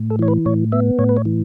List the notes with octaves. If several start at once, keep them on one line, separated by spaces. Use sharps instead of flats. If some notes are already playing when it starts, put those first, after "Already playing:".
Already playing: A2
A4
E3 C#5
B4
A2 C#5
B3 E5
A2 C#5
B4
C#5
E3